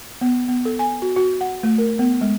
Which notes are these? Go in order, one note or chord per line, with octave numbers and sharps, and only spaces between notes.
B3
B3
A4
G#5
F#4
F#4
F#5
A3
A#4
B3
G#3